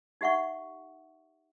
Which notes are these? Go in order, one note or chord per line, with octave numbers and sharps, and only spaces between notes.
D#4 G4 E5 F#5 C#6